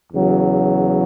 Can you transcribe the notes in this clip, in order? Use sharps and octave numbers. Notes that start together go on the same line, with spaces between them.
E2 C#3 F#3